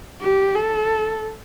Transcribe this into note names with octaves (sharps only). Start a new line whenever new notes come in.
G4
A4